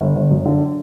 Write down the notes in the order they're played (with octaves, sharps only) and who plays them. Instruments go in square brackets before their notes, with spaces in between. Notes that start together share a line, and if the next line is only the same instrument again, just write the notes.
[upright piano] G1
G1
F#2
D3